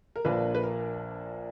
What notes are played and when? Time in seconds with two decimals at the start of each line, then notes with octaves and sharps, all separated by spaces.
0.16 A#4
0.25 A#1 A#2 F3 A#3 D4 B4
0.55 B4
0.63 A#4